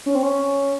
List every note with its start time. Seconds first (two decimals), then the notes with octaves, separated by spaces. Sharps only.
0.06 C#4
0.15 C4
0.23 C#4